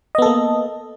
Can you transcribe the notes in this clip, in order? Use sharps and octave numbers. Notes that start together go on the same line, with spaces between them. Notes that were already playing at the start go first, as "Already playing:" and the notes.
A#3 B3 A4 D#5